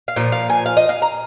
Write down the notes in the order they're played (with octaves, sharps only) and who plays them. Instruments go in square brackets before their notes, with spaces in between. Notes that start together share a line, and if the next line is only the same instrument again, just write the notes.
[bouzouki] F5
A#2 F3
F5
G#5
F5
D#5
F5
A#5